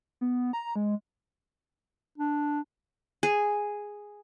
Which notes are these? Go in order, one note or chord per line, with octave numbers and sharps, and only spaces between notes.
B3
A#5
G#3
D4
G#4